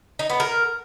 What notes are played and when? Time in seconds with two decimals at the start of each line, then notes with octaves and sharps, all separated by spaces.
0.19 D#4
0.30 B3
0.40 A#4